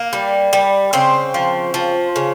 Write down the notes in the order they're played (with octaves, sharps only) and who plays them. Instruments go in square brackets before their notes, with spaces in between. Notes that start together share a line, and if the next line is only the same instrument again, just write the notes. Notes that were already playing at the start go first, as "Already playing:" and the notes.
Already playing: [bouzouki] A#3
G3
G3
C#3 C4
F3
F3
C#3